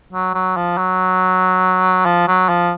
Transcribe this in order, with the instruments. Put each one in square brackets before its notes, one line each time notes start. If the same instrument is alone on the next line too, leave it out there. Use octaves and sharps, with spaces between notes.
[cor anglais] F#3
F#3
F3
F#3
F3
F#3
F3